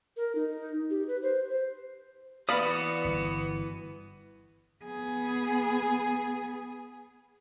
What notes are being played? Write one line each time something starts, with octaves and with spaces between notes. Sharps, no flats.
A#4
D#4
G4
B4
C5
C5
E3 B3 F#4 D5 F5 B5 D#6
G1
B3 G#4